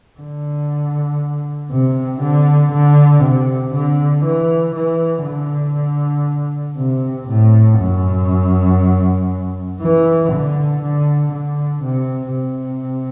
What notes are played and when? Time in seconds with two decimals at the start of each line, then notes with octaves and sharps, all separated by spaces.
0.19 D3
1.70 C3
2.21 D3
2.72 D3
3.23 C3
3.74 D3
4.24 E3
4.75 E3
5.25 D3
6.77 C3
7.27 A2
7.79 F#2
9.80 E3
10.32 D3
10.82 D3
11.33 D3
11.83 C3
12.34 C3